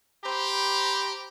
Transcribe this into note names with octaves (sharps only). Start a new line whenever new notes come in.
G4 C5 A#5 B5